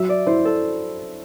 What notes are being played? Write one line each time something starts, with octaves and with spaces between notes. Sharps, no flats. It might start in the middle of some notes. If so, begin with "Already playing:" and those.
Already playing: F#3 E5
D5
E4 C5
A4